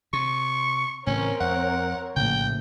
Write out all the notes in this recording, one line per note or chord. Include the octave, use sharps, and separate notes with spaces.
C3 C#6
A2 C#3 E3 C4 C#4 A#4 C#5
F2 F#5
A#1 A2 C#3 A#3 G5